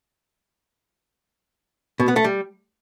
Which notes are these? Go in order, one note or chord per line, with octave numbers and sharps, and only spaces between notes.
B2
B3
A3
G3